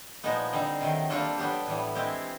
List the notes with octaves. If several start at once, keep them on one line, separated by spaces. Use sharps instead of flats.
A#2 F3 G#3 B3 D#4
D3 G3 C4 D#4
C3 D#3 F#3
G3 A#3 D4 F4 A4
F#3 B3 D4 G4
A2 E3 G3 B3
G#3 C4 E4 G4